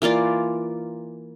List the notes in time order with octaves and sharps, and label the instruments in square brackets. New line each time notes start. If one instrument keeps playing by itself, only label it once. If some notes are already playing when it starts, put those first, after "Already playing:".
[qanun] E3 A#3 F4 D5